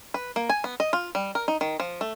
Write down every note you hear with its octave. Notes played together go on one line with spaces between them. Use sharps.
B4
A#3
G#5
B3
D#5
F4
G3
A#4
D#4
D#3
F3
A3